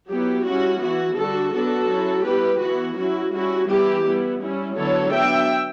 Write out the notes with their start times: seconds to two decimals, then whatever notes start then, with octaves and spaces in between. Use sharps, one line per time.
0.09 F#3 B3 E4 G4
0.45 G3 C#4 E4 F#4
0.81 E3 B3 E4 F#4
1.16 D3 G3 D4 F#4 A4
1.53 F#3 B3 D4 F#4 A4
1.89 F#3 C#4 E4
2.24 G3 B3 E4 G4 B4
2.61 E3 B3 E4 F#4
2.96 F#3 C#4 E4 F#4
3.33 G3 C#4 E4 F#4
3.68 E3 G3 B3 E4 G4
4.04 G3 B3 E4
4.40 G3 C#4 E4
4.76 D3 F#3 B3 E4 A4 C#5
5.11 F#3 B3 D4 E5 G5